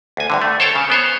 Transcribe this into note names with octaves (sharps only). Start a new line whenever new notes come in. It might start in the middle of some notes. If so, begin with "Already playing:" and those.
D2 G#5
D2 G2 D3
A3
A4 C5 C#5 G5 A5
C#3
B3 C5 C#5